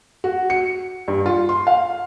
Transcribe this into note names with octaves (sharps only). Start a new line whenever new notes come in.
F#4
C#7
G2
F4
C6
F5